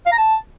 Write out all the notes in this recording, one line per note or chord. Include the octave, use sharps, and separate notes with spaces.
F5
A#5
A5